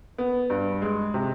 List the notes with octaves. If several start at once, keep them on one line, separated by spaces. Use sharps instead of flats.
B3
G2
G#3
C3